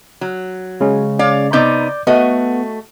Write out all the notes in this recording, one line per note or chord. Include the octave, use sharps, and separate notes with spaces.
F#3
C#3 G#3 C#4
C#5 D5 F5
C3 B3 D#4 D5 D6 G6
A3 B3 F#4 D#5